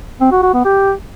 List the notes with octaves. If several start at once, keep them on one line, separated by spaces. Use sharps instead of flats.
C4
F#4
F#4
B3
G4